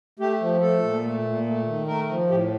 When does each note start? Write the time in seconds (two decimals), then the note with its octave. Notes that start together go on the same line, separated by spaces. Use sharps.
0.19 A3 G4
0.41 F3
0.61 A3 A4
0.83 A#2
1.04 A3
1.25 A#2
1.46 A3
1.66 D#3
1.87 A3 A#4
2.09 F3
2.29 A2 G4